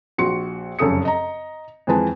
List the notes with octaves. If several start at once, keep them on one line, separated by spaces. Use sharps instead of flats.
A#1 F#4 C6 C#7
F1 F#2 C#3 A4 D#6 C#7
D#5 A#5
F2 E3 G#3 B4 A5